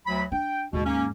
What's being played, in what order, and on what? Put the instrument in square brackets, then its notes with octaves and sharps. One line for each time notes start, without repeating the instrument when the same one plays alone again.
[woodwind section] D2 F#3 B5
[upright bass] D4 [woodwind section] G5
[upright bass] D#2 G#2 [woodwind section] B2
[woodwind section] A#3 C#4